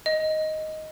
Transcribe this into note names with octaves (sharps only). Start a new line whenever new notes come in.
D#5